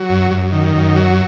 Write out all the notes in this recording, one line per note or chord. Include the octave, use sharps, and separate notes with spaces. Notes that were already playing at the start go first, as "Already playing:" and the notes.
Already playing: F#3
F#2
F#2
D#3
F#2
F#3